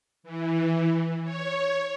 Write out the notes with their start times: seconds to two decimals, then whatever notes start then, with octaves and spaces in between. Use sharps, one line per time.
0.23 E3
1.24 C#5